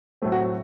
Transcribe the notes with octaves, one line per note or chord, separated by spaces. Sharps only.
A2 F#3 A3 C4
F#4